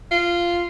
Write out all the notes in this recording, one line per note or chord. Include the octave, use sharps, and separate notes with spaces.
F4